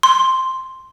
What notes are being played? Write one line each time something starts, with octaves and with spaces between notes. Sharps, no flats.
C6